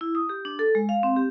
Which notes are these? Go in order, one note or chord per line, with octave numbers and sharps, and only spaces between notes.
E4
D#6
G4
D4
A4
G#3
F5
C4
G4